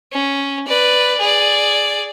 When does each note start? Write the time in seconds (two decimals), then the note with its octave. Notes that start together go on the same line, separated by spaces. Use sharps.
0.13 C#4
0.67 B4 D5
1.20 G#4 D5